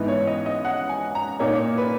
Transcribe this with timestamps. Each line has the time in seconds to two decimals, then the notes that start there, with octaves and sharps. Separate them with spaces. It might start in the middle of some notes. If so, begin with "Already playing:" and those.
Already playing: G#2 E3 B3 D#4 B4
0.08 C#5
0.27 D#5
0.46 D#5
0.65 F#5
0.89 G#5
1.15 A#5
1.39 A#2 A#3 D#4 C#5
1.78 B4